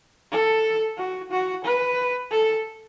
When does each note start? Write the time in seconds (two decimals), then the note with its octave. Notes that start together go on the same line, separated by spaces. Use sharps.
0.32 A4
0.98 F#4
1.31 F#4
1.65 B4
2.31 A4